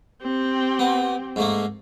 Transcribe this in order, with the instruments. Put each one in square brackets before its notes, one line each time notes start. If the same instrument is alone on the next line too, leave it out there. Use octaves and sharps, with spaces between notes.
[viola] C4 G4
[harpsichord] B3
G#2 A3 A#3